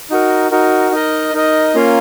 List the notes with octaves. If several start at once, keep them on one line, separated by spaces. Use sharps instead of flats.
D#4 F#4 A#4
D#4 F#4 A#4
D#4 A#4 D#5
D#4 A#4 D#5
A#3 C#4 F4 A#4 F5